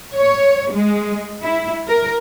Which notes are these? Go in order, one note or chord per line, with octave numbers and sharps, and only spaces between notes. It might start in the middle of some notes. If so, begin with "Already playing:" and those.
C#5
G#3
E4
A#4